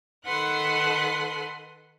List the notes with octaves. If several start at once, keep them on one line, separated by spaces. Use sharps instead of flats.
D#3 A4 B4 F#5 C6 F#6